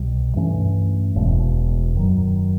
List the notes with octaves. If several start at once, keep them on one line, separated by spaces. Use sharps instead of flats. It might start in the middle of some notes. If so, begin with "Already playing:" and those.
Already playing: C2 B2 G3
G2 E3 A3 C#4
E1 E2 B2 G#3
F#2 D#3 F#3